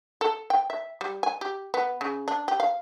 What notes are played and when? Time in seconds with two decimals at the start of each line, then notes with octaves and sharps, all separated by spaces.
0.21 A4
0.50 G5
0.70 E5
1.01 G3
1.23 G#5
1.41 G4
1.74 B3
2.01 C#3
2.28 D4
2.48 G4
2.60 F5